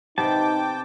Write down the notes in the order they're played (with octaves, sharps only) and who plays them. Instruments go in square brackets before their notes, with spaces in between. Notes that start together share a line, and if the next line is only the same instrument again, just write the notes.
[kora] C3 B3 C4 [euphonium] D#4 [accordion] G5 D6 [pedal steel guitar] A5